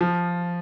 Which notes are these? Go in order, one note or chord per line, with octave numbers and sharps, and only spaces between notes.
F3